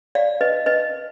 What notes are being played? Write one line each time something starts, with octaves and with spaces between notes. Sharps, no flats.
D5 F5
B4 D#5
B4 D#5